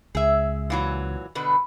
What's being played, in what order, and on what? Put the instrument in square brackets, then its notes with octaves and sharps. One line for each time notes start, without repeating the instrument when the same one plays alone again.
[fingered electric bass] C#2 [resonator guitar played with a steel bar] G#4 E5
[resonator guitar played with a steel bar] A#2 E3 F#3
B2 D3 B4